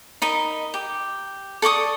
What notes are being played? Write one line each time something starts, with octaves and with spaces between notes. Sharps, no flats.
D#4 A#4 D#5 B5
G4
A4 D5 C#6 D#6